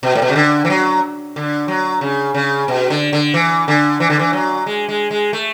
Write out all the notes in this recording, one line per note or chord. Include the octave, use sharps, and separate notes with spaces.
B2
A2
B2
C#3
D3
E3
F#3
D3
F#3
C#3
C#3
B2
D3
D3
E3
D3
E3
D3
E3
F#3
G#3
G#3
G#3
A3